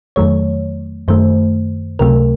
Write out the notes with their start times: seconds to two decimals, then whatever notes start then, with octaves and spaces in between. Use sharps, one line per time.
0.16 F2 D#3 F#3 A3 C#5
1.08 F#2 D#3 A3 C5
1.99 C#2 C3 F#3 A3 A#4